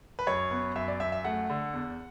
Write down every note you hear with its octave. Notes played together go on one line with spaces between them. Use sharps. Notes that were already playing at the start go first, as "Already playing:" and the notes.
B4
F#2 C#5
B3
F#2 E5
D5
F#2 E5
E5
A3 F#5
D3
E2